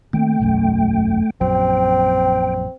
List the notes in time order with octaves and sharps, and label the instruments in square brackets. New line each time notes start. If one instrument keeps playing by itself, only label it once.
[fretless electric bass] D#3 A#3 C4 [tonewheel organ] A3 G5
[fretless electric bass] E1 B1 F#2
[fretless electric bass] A#1 F#2 F#3 [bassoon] C4 [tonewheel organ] G5